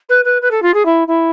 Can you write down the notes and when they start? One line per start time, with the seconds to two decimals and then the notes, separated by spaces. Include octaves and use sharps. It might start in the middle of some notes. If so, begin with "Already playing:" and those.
0.09 B4
0.25 B4
0.42 B4
0.51 A4
0.62 F4
0.74 G#4
0.85 E4
1.07 E4